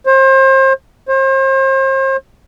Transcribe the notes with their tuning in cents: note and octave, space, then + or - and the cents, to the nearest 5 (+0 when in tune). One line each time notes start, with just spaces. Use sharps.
C5 +35
C5 +40